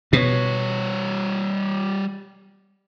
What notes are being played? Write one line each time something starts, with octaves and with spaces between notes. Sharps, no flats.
B2 G3 C#5